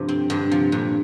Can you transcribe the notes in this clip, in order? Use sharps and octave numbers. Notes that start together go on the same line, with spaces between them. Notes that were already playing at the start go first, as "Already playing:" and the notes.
Already playing: G2 C3 F3
C4
G2 D3
C3 F3
G2 A#2